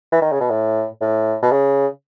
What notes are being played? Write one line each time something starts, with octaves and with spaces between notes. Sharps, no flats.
E3
D#3
C#3
B2
A2
A2
B2
C#3